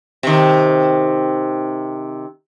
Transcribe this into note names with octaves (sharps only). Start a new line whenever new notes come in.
C3 D#3